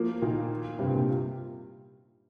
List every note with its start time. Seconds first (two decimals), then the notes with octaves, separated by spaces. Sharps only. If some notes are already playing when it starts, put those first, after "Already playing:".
Already playing: F3 A#3
0.22 A#2 D#3
0.79 G2 C3
0.94 A#2